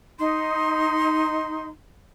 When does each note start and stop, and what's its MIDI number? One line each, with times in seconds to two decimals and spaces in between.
0.19 1.68 63
0.19 1.68 84